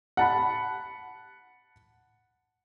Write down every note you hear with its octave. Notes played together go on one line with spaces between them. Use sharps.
F#5 A5 B5